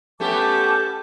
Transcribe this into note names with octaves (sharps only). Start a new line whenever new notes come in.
A3 B3 C#4 G4 A5 D6